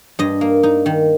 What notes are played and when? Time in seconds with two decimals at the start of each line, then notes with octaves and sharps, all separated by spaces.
0.19 G2 D#5
0.41 A#3
0.63 D#4
0.86 D#3